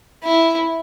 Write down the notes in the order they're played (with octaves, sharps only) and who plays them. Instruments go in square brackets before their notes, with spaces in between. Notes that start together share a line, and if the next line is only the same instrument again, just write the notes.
[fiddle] E4